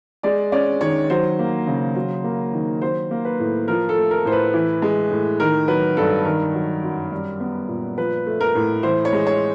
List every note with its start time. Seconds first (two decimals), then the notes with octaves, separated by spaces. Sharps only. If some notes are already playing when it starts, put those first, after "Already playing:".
0.23 G#3 D5
0.52 C#4 D5
0.81 D#3 C#5
1.10 F#3 C5
1.39 A#3
1.67 C#3
1.95 F#3
2.24 A#3
2.53 D#3
2.82 F#3 C5
3.11 A#3
3.25 B4
3.40 A2
3.68 F3 A#4
3.89 A4
3.97 A3
4.11 A#4
4.25 A2 C5
4.32 B4
4.54 E3
4.82 G#3
5.11 A2
5.40 D#3 A#4
5.68 F#3 B4
5.97 G2 A4
6.25 D#3 A#4
6.54 F#3
6.84 F#2
7.12 G3
7.40 B3
7.68 A#2
7.98 F3 B4
8.26 A3
8.41 A#4
8.55 A2
8.83 E3 C5
9.05 C#5
9.13 G#3
9.27 C#5